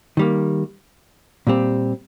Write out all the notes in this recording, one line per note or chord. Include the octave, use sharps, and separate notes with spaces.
D#3 G3 A#3
A#2 G3 C4 G4